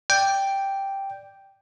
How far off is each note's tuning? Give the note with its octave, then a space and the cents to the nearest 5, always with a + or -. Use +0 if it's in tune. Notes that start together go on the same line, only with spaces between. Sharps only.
D5 +0 G5 +0